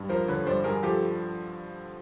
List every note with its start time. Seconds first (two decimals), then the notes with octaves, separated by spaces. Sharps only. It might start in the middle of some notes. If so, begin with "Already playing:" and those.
Already playing: G2
0.09 F3 A#4 C5
0.28 D3 B4 C#5
0.46 G2 C5 D5
0.64 G2 G#4 A#4
0.83 F3 G4 A4